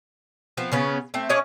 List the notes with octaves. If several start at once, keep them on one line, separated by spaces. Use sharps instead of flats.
F3 B3 C4
C#3 B3 C#4
A3 C4
C#4 D4 C#5 D#5